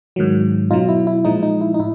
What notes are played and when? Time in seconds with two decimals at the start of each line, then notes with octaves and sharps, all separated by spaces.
0.16 G#2 D#3 F#3
0.70 B2 F#3 D#4 F4
0.88 E4
1.07 E4
1.24 A#2 F3 G#3 D#4
1.43 D#4
1.61 E4
1.74 D#4
1.79 A2 E4